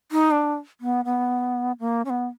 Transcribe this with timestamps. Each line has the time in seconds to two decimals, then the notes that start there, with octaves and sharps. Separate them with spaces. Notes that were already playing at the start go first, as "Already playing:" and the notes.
0.12 D#4
0.31 D4
0.81 B3
1.05 B3
1.80 A#3
2.05 C#4
2.10 B3